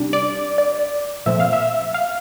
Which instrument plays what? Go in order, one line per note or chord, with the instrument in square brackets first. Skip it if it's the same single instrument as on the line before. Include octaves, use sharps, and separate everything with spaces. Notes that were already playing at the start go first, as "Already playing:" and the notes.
Already playing: [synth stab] C3 G3 D4
D5
D5
A#2 F3 A3 C4 E5
F5
E5
F5